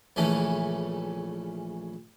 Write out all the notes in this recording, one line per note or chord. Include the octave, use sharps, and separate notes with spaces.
A#1 C#3 E3 A3 C#4